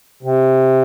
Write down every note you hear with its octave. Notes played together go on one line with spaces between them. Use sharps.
C3